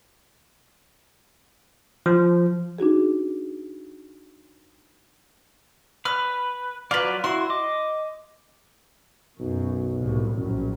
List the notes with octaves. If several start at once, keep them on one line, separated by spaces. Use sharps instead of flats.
F3
D4 D#4 F#4 G#4
B4 F6
F#3 F4 B4 D5
E4 F#4 C6
D#5 D6
B1 F#2
C2 A2
A#1 F#2